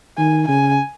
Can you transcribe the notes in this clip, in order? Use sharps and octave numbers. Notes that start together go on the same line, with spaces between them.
D#3 G#5
C#3 G#5